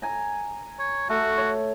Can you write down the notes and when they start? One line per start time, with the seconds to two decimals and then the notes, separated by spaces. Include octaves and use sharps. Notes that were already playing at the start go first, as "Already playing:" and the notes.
0.02 G#5 A#5
0.79 C#5
1.09 A3 F#4
1.38 C#5